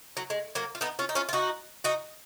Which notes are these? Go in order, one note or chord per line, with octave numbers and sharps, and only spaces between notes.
F#3
G#3
F#3 A#3
F4
B3 D#4
C#4 F4
D#4
C#4 F4
F4
D#4 F#4
D#4 F#4